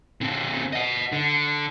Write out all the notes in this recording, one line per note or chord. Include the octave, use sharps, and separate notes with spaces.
D3 C4
D#5 F#5
D3